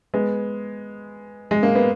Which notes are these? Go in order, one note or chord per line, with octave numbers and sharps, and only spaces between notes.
G#3 B3
G#3
A#3
B3